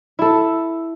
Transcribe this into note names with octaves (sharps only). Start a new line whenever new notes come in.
E4 A4